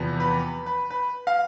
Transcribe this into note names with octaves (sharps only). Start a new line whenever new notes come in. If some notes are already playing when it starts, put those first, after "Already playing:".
Already playing: E2 C3 F3 B3
B4
B4
B4
F5